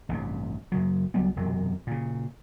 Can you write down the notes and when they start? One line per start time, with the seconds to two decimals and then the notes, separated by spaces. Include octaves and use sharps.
0.09 A1 G2 C3
0.72 F#2 C#3 F#3
1.14 C#2 F#3 G3 B3
1.36 E1 F#2 C3 F#3
1.87 A#2 C#3